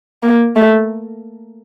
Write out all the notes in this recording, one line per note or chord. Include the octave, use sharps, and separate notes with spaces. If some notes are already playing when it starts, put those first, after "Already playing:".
A#3
A3